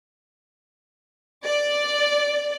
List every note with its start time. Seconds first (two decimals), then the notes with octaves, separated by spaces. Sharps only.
1.47 D5